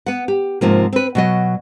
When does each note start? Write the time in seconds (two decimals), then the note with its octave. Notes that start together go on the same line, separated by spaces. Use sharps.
0.06 B3 F#5
0.28 G4
0.61 G#2 C3 F3 A#3
0.93 C4 B4
1.15 B2 F#3 D#5